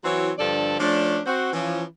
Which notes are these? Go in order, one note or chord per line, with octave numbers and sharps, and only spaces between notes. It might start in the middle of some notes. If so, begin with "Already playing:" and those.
E3 F#3 C4 E4 F#4 C#5
G2 D3 F3 A4 D5
F3 A3 C#4 D4
C4 F#4 C5
E3 F3 C#4